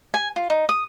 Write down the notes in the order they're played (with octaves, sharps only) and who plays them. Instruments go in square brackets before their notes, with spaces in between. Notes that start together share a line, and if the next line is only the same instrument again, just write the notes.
[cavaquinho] G#5
F4
D#4
D#6